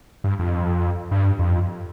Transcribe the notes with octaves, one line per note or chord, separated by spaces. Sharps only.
G2
F2
G2
F2